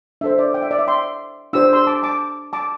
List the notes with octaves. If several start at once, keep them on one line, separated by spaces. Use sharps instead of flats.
D4 A4 C5 E5
D5
G5
E5
D5
E5
G5 C6
D4 G4 C5 E6
C6 E6
A5 D6
A5 D6
A5 D6